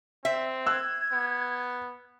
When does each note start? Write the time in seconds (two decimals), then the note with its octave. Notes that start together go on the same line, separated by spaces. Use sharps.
0.25 C4 E5
0.66 E6 F#6 G#6
1.13 B3